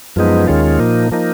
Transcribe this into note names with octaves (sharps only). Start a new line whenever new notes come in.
F#2 F3 G#3 B3 D#4
D#2 D#3 G#3 C#4 F4
A#2 F3 A#3 D#4
F3 A#3 D#4